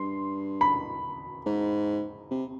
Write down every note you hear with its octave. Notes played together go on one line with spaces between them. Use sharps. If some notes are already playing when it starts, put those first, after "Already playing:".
Already playing: G2 C6
B5
G#2
C3